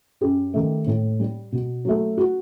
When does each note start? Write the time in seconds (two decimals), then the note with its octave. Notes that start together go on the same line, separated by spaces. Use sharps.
0.21 F#2 G4
0.54 D#3 A3
0.87 A2
1.20 G3
1.52 B2
1.85 F#3 A3
2.17 F#4